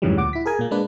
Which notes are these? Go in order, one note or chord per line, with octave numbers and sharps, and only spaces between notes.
F2 G#2 C#3 E3 F#3 G3
D2 A#2 F#5 D6
E4 B6
G#4 A#4 G#5
A#2 A#3
G#3 A#3 D4 B4